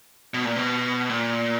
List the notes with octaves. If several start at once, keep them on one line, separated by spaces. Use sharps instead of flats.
B2
A#2
B2
A#2